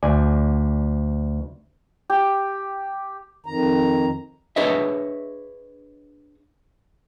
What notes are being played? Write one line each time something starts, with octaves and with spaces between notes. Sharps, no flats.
D2 D5 G#5
G4
F2 D#3 A#5
D4 G#4 B4 C#5 D#5 E5